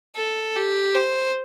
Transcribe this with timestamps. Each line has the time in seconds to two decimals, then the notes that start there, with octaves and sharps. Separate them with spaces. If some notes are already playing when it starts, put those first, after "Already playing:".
0.16 A4
0.55 G4
0.95 C5